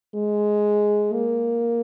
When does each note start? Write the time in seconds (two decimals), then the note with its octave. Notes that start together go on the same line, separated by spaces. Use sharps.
0.15 G#3
1.14 A#3